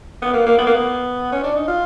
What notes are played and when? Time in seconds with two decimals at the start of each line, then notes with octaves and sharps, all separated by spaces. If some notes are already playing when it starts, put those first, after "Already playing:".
0.22 B3
0.33 A#3
0.46 A#3
0.58 B3
0.66 A#3
0.74 B3
1.32 C#4
1.44 D4
1.56 D#4
1.68 F4